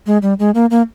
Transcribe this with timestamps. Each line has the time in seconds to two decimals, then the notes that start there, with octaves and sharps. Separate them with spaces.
0.06 G#3
0.22 G3
0.39 G#3
0.55 A#3
0.71 A#3